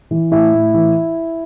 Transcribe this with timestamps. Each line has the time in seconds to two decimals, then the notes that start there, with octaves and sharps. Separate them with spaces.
0.11 E3
0.32 A2 E4
0.54 A2
0.74 E3